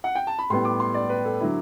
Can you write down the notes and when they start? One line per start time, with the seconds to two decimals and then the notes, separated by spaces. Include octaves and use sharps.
0.04 F#5
0.15 G5
0.27 A5
0.39 B5
0.50 A2 G3 B3 C6
0.65 D6
0.80 C6
0.94 D5
1.09 B4
1.25 A4
1.40 D3 F#3 E4